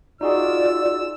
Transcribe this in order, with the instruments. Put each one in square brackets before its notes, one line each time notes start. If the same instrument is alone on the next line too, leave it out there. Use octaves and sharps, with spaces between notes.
[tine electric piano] D#4 F#4 G#4 [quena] F4 [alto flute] D5 [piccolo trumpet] E6